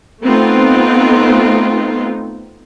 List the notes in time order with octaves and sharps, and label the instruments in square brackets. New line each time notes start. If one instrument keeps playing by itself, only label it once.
[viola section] A3 B3 C4 D#4 F4